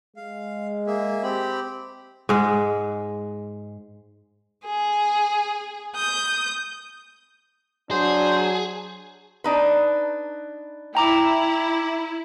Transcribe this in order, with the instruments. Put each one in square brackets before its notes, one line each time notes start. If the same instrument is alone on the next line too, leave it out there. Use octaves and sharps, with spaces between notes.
[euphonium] G#3 [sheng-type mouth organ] F5
[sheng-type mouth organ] A#3 G#4 E5
C4 G4 B5
[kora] G#2 G#3
[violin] G#4
D#6 G6
[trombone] F#3 [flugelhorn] D4 [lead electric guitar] G#4 [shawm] C5
[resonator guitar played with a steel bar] D4 D#4 B4
[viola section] E4 [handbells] G5 A#5 D6